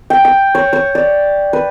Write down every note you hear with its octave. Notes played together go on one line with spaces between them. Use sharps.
G5
D#6
C#5
C#5
D5
B4